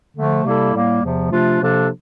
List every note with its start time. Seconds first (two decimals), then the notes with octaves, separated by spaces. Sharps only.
0.15 D3 F3 A3
0.44 C3 G3 A#3 E4 A4
0.73 A2 G3 A#3
1.02 E2 C3 F3
1.31 C3 F3 A3 D4 F4
1.60 C3 F3 A#3 D4 A4